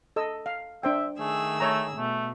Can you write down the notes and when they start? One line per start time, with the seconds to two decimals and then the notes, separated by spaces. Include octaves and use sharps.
0.16 A4 D#5 E6
0.46 F5
0.83 D4 C5 E5 G5
1.19 D#3 A3 G#4 E6
1.60 A3 C#5 A5 A#5
1.97 B2 A3